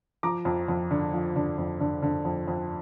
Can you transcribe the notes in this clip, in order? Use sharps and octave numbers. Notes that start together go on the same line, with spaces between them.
F3 A#5 D6
F2
F2
D3
F3
D3
F2
D3
D3
F2
F2